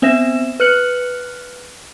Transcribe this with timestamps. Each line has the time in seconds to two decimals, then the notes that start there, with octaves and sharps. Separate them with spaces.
0.02 B3 C4 C5 E5 A#6 E7
0.60 B4 F6 F#6 C#7 F#7